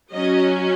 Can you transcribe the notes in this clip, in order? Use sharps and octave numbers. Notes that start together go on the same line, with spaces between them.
F#3 C#4 D#5